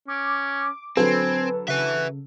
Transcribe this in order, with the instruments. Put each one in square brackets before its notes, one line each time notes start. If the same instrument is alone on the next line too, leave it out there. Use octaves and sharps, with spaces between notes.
[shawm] C#4 [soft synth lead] D6
[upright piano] D3 F#3 A4 [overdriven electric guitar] C4 [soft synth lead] B4 [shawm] G#5
[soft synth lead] C#3 [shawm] F#4 [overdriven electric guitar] B4 E5